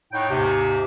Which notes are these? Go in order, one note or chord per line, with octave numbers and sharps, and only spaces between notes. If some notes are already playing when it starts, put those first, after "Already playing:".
A2 D#4 C#5 F#5 G5
D#2 G#2 C3